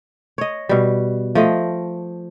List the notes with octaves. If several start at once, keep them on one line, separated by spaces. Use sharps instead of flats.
C#5 D#5
B2 G3
F3 A3 D#5